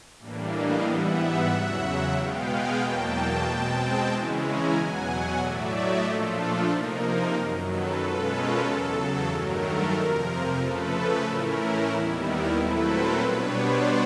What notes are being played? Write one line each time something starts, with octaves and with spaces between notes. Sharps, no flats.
A2 E3 G3 A#3 D4
D#5 F5
G#2 E3 G3 B3 E5 F#5
E2 C#3 F#3
B2 G#3 B3 F5 G5
F#5 G#5
E2 B2 F#3 A#3 G5 A5
B2 G#3 C4 G5 A5
C#3 E3 G#3 C#4 E4
G#5 A#5
E2 B2 F#3 F#5 G#5
A2 F#3 A3 D5 E5
C#5 D#5
A#2 F3 A3 D4 F4 A4
A4
C3 F3 A#3 D#4 A#4
F#2 D#3 F#3
A4 B4
B2 G#3 C#4 F4 A4 B4
A#4
E2 C#3 F#3 A4
A4
G2 D#3 F#3 A3 A#4
A4
F2 C3 F3 A#4
C#3 F3 A3 A4 B4
A2 E3 A3 C#4 E4 A#4
D#2 D#3 G3 B3 E4
A#4
A#2 F#3 A3 C4 E4 A4 B4
A#4 C5
B2 G3 B3 D4 B4 C#5
C5 D5